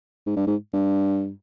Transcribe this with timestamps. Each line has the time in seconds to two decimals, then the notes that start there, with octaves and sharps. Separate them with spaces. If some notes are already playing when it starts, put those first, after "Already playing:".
0.26 G#2
0.36 G2
0.47 G#2
0.73 G2